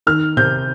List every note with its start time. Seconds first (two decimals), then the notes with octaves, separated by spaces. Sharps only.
0.07 D#3 F6
0.37 C3 G6